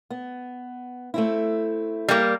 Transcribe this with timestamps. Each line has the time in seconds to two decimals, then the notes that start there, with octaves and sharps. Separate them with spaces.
0.10 B3
1.14 A3 C4 E4
2.08 G3 A#3